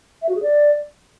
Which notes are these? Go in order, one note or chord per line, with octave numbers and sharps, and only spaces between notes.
E5
F#4
G#4
D5